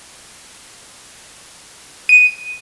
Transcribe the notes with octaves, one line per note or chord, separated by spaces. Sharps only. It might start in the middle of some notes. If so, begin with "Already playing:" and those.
D#7